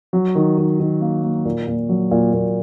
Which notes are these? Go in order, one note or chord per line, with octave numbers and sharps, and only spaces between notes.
F#3
D#3
D#3
D#3
A#3
A#3
A#2
A#2
F#3
A#2
A#2